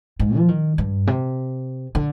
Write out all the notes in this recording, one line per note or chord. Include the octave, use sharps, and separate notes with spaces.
G#2
F3
D#3
G2
C3
D3